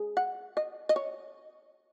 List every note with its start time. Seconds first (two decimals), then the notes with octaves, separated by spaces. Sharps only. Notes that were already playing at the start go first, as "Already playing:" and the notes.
Already playing: G#4
0.17 F#5
0.57 D#5
0.89 D#5
0.96 C#5